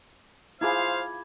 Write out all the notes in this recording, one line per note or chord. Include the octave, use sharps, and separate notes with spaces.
E4 F4 G#4 C5 F5 B5 D6 G#6